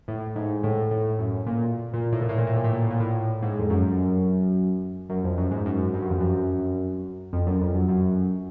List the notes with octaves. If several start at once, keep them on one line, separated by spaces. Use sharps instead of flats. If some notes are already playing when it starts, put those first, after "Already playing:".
A2
G#2
A2
A2
F#2
A#2
A#2
A2
A#2
A2
A#2
A2
A#2
A2
A#2
A2
A#2
A2
G#2
F2
F#2
F#2
F2
F#2
G#2
F#2
G2
F#2
F2
F#2
F2
F#2
F2
F#2
F#2